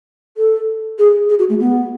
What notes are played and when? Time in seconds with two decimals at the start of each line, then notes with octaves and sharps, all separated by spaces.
0.37 A4
0.99 G#4
1.29 G#4
1.39 F#4
1.50 A3
1.60 B3